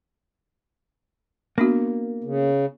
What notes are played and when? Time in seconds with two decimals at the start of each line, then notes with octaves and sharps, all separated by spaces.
1.58 A#3 B3 D4 F#4
2.24 C#3